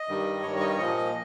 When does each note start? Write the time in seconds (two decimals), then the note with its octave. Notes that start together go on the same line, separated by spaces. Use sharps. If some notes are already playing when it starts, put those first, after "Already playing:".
Already playing: D#5
0.08 G2 D#3 G3
0.43 G2 D#3 G3 C#5
0.55 C#5
0.60 D#5
0.66 C#5
0.78 A#2 F3 D#5